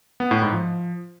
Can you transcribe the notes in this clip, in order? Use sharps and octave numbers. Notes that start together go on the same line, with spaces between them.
B3
A2
G#2
F3